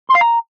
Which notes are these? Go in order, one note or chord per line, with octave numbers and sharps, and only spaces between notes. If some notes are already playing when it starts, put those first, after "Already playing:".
C6
F5
A#5